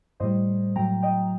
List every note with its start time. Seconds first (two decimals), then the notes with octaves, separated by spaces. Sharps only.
0.20 A2 G3 C5 D#5
0.76 A2 F#3 G5 A#5
1.02 D#5 G5